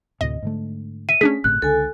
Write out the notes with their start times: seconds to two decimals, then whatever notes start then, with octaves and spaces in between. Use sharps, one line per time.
0.21 D2 A2 C3 D#5
0.42 G#2 D3 A3
1.09 E5 D#7
1.21 A3 C#4 D4 G#4 B6
1.44 G1 A2 C3 F#6
1.62 C#2 D3 A4 G#5